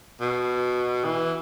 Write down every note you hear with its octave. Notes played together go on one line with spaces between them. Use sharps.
B2
E3